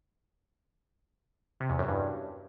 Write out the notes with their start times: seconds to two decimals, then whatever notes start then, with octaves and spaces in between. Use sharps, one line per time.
1.60 C3
1.70 E2
1.79 F#2
1.88 G2